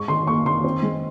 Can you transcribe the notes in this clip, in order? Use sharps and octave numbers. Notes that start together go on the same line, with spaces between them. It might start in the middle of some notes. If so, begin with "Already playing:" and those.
Already playing: G#2 C#6
D#3 C6
A#3 C#6
D#3 C6
C4
G#3